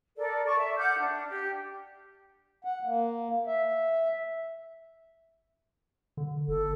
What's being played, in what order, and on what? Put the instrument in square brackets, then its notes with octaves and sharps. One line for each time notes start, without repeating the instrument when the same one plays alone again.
[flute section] A4 A#4 D5
D5 A5 C#6 D6
E5
F#5 D6 F6 G6
D4
G4
[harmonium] F#5
A#3
E5
[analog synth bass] D3
[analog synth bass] G1 [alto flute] A4